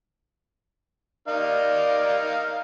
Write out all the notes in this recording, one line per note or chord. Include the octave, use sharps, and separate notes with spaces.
D#4 A#4 D5 F5